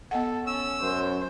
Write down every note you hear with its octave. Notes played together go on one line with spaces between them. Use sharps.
B3 A4 D#5 F#5
C#4 E6
F#2 C5